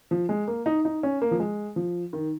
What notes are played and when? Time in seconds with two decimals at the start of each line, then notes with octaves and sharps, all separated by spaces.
0.11 F3
0.29 G#3
0.48 A#3
0.66 D#4
0.85 D#4
1.03 C#4
1.22 A#3
1.31 F3
1.40 G#3
1.76 F3
2.13 D#3